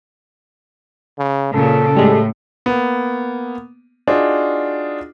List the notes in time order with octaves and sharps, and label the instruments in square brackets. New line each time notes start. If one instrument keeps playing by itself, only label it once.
[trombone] C#3
[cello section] A#2 C#3 [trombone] A4
[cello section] A2 [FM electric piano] G3 G#3
[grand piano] A#3 B3
D4 D#4 F4 F#4 G#4